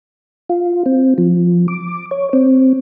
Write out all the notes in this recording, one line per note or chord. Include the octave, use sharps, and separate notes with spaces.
F4
C4
F3
D6
C#5
C4